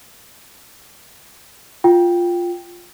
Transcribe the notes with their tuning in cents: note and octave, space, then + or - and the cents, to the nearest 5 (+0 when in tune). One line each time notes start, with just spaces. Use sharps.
F4 +0 G5 +0